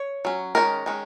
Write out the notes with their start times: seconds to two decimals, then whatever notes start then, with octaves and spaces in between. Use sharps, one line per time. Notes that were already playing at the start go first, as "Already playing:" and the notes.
Already playing: C#5
0.25 F#3 C#4
0.55 D#3 G#3 C#4 A#4
0.86 D#3 G#3 C#4